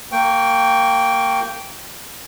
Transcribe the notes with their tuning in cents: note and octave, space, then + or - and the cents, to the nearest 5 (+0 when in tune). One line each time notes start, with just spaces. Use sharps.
A#3 -15 G5 +0 C#6 +0